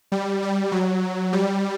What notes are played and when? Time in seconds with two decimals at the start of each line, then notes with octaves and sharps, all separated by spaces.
0.12 G3
0.42 G3
0.72 F#3
1.33 G3